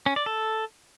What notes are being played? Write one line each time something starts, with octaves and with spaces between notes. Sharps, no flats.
C#4
D5
A4